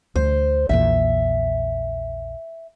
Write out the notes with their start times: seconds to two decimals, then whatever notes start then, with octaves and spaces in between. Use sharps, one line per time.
0.15 D2 C5
0.69 A#1 E2 A#2 E5